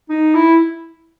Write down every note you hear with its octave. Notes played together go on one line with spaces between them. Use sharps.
D#4
E4